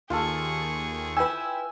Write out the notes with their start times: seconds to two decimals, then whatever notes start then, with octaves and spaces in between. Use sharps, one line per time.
0.10 D#2 F4 G#4 A4 C#6
1.17 E4 B4 G5 G#5 E6